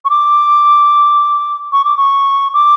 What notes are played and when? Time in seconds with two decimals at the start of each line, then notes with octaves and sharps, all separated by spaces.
0.05 C#6
0.10 D6
1.72 C#6
1.85 D6
1.97 C#6
2.54 D6